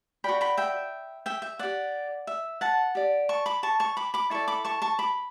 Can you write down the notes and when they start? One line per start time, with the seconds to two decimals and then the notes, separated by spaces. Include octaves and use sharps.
0.24 F#4 B4 D5 G5 B5
0.41 G5 B5
0.57 E5 G5
1.26 E5 G5
1.42 E5
1.59 G4 D5 F#5
2.27 E5
2.61 F#5 A5
2.95 G4 D5
3.29 A5 C#6
3.46 B5 D6
3.63 A5 C#6
3.80 A5 C#6
3.97 B5 D6
4.14 B5 D6
4.30 E4 A4 D5 A5 C#6
4.48 B5 D6
4.65 A5 C#6
4.82 A5 C#6
4.99 B5 D6